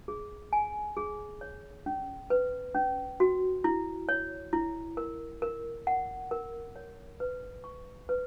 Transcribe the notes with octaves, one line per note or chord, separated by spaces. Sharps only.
G#4
G#5
G#4
C#5
C#4
B4
C#4
F#4
E4
C#5
E4
A#4
A#4
F#5
A#4
C#5
B4
C#6
B4